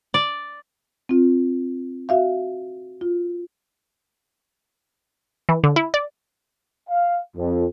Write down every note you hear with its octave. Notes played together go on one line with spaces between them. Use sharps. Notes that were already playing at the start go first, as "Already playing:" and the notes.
D5
C4 F4
F#4 E5 F5
F4
E3
D3
E4
D5
F5
F2